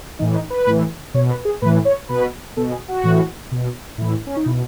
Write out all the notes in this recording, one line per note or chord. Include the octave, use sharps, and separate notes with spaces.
A2 E3 D#4
D#4
B4
A2 E3
B2 C#5
B4
G#4
A2 E3 B4
C#5
B2 B4
B2 A4
G#4
F#4
A2 E3
B2
A2 E3 E4
C#4
D#4
B2 E4